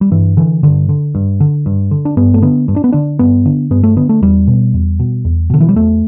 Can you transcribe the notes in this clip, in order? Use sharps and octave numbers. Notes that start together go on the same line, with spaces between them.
G3
G2 E3
D3 E3
G2 D3
D3
G2
D3
G2
D3
D4
G2 B3
A3
D3 B3
G2
D4
B3
D3 D4
G2 B3
D3
G2 B3
A3
D3 B3
A3
E2 G3
B2
E2
B2
E2
B2 D3
E3
G3
E2 A3